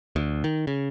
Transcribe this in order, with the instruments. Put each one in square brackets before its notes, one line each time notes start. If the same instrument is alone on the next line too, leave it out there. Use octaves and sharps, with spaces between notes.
[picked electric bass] D2
D#3
C#3